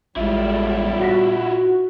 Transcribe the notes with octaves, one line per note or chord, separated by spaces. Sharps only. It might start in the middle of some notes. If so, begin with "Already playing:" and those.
A1 E2 A2 G3 G#3 E4 F4
A#2 F#4 A#6 B6